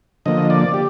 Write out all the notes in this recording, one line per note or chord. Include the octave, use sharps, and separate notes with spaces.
D3 F3 A#3 D#5
D5
G4